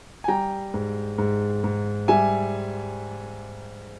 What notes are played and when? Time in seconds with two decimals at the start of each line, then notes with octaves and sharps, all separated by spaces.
0.24 G#5
0.28 G3 G5 A#5
0.74 G#2
1.18 G#2
1.64 G#2
2.08 G3 E5 G#5